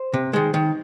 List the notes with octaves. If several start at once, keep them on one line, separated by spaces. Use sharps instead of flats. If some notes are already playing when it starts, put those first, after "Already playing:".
Already playing: C5
C3
D#3 G#3
D#3